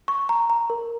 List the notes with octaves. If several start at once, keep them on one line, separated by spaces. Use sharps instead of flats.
C#6
A#5
A#5
A#4